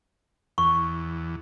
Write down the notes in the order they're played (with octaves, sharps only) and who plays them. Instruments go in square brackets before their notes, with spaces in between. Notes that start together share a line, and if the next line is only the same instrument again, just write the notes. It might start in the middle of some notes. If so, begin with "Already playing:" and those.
[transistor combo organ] E2 [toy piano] C#6